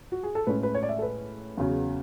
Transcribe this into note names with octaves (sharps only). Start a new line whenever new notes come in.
F#4
G#4
A4
A2 G#3 C#4 B4
B4
C#5
D5
E5
A4
B4
E2 C#3 F#3